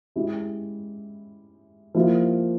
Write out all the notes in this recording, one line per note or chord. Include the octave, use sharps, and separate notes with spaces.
G#3 C#4 E4 G4
F3 A#3 E4 G4